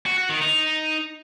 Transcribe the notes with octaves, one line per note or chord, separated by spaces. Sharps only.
F#4
F#4
D#3
D#4